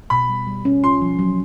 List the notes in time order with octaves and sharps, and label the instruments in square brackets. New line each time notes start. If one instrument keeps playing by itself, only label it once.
[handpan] B2 [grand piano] B5
[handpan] G3
G3
C#4
[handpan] F4 [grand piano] C6
[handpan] F3
F#3